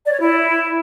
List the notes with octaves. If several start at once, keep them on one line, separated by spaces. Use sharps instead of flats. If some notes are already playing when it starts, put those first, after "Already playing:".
D5
C#5
E4